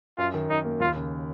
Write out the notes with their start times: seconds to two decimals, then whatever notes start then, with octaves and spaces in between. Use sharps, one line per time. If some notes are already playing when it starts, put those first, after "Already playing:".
0.18 F#2 F4
0.34 D#3
0.49 F#2 D#4
0.65 A#3
0.80 D#2 F4
0.96 C#3